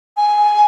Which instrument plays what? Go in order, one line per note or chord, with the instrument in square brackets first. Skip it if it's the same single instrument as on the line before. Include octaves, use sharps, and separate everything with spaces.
[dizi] G#5